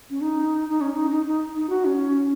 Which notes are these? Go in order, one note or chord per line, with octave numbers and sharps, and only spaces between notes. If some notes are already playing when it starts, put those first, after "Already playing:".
C#4
D#4
D#4
C#4
D#4
D#4
D#4
D#4
F#4
C#4